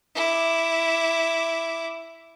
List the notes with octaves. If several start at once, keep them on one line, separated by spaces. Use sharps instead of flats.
E4 D6